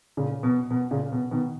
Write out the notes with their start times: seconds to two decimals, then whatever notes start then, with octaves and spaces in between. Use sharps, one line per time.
0.17 A#2 C#3
0.43 B2
0.71 B2
0.91 A#2 C#3
1.12 B2
1.31 B2 D#3